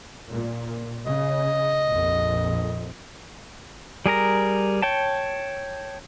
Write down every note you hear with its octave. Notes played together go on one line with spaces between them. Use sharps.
A#2
C#3 D#5
A#1 F2
G3 G#4 A#4 A#5
C#5 G5 A5